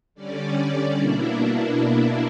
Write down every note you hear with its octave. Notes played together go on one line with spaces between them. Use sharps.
D3 G3 C#4 D5
D5
B2 A#3 D4 E4